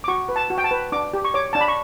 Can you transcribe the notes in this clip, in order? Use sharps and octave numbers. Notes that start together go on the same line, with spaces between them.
D6
F#4 C#6
B4
A5
F#4
G5
A5
B4
D4 D6
G4
C#6
C#5 D6
D4 A5
B5
C#6